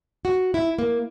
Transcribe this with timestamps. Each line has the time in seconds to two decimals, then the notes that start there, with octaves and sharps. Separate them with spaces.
0.25 F#4
0.54 E4
0.79 A#3